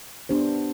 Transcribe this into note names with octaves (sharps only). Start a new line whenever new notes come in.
B3 D4 G4 C5